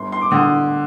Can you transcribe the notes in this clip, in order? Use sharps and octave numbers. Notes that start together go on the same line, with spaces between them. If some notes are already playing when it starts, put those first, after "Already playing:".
Already playing: G1 C6
C6
D6
D3 D#6